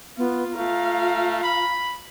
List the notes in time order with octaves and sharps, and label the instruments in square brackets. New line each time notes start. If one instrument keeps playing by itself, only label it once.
[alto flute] B3 [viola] F4
[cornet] A3 [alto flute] F4 [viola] F5 A#5
[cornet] B5